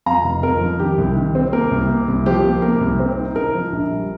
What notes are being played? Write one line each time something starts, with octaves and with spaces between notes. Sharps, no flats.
F2 F5 A#5
F1
F2 A#4
F3
D#3 G4
C2
D#3
C4
A#3 A#4
C2
A#3
C2
F3 G4 C5
A#3
A#3 A#4
C2
C4
D#4
D#4 A#4
F3
A#1
G3